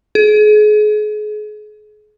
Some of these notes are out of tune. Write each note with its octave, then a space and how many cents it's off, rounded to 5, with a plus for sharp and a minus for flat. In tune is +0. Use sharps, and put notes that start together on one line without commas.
G#4 +35